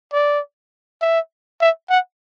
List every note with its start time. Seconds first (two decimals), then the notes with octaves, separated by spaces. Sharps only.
0.13 D5
1.01 E5
1.61 E5
1.90 F#5